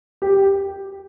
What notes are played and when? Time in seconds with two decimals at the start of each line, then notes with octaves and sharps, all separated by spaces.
0.22 G4